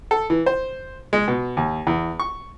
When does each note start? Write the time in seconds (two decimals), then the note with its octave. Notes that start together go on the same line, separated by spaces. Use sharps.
0.11 A4
0.30 E3
0.46 C5
1.13 G#3
1.28 B2
1.57 D#2
1.87 E2
2.20 C#6